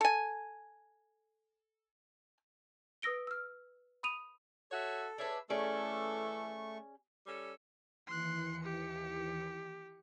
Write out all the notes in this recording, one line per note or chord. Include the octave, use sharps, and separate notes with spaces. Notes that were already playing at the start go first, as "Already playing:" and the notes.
A4 G#5
B4 D#6 E6 A#6 D7 G7
E6 F6
B5 D#6 D#7 F7
F#4 A4 C#5 E5
D4 G#4 B4 C#5 E5
E3 A3 C#4 G#4 A4 D5 C#6
G3 C#4 A4
D#2 E3 C6 F#6 C#7
G4